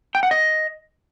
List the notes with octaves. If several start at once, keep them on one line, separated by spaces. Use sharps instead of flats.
G5
F#5
D#5